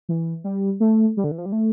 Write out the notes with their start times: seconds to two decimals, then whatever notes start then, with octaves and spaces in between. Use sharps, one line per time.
0.09 E3
0.44 G3
0.80 A3
1.17 G3
1.24 D3
1.31 E3
1.38 F3
1.46 G3
1.52 A3